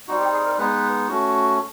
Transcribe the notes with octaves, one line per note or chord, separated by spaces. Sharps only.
G3 C4 D#4 F#4
G4
G#4
A#4
G#3 B3 D#4 B4
A3 C#4 F#4